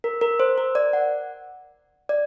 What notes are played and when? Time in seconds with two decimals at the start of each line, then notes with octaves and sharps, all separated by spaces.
0.04 A#4
0.21 A#4
0.40 C5
0.58 A#4
0.75 D5
0.93 F#5
2.09 D5